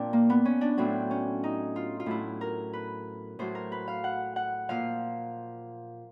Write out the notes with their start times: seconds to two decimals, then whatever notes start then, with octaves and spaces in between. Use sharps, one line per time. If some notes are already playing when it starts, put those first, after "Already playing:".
Already playing: A#2 F3 C4 D4
0.13 A#3
0.30 B3
0.45 C#4
0.61 D4
0.78 A2 F#3 C4
1.11 C#4
1.44 D#4
1.76 F4
2.00 F4
2.06 A2 F#3 E4
2.41 A#4
2.73 B4
3.39 A2 F#3 C5
3.55 A#4
3.72 B4
3.88 F5
4.04 F#5
4.36 F#5
4.69 A#2 F3 F5